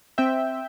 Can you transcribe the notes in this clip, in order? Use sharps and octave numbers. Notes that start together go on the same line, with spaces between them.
C4 E5 G5